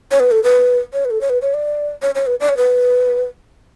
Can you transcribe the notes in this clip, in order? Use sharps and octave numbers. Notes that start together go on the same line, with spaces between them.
C#5
B4
A4
B4
C#5
B4
A4
C#5
B4
C#5
D5
C#5
C#5
B4
D5
C#5
B4